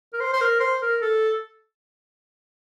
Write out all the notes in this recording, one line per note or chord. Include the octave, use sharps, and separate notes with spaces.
A#4
C5
C5
A#4
C5
A#4
A4